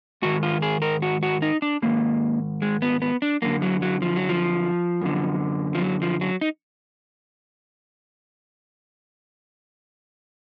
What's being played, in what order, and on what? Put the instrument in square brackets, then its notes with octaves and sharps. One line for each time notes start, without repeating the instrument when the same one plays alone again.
[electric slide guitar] G#2 D#3 F#4
F4
G#4
A#4
F#4
F#4
D#4
D4
G#2 D#3 A#3
G#3
B3
B3
D4
F#2 D3 A#3
F#3
F#3
F3
F#3
F3
F#2 D3
F3
F#3
F3
F#3
D#4